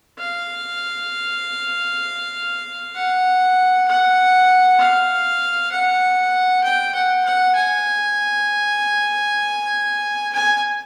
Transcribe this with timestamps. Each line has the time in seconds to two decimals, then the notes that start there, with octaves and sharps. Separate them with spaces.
0.19 F5
2.95 F#5
3.88 F#5
4.79 F5
5.72 F#5
6.64 G5
6.95 F#5
7.25 F#5
7.56 G#5
10.33 G#5